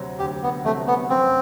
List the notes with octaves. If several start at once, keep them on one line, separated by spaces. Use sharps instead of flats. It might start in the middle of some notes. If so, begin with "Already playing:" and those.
Already playing: D2 C3 F#3 C4
D2 G4
B3
C3 F#3 A3 C4
B3
F#2 C4